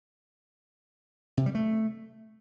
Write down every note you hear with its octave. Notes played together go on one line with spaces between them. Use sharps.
C3
G3
A3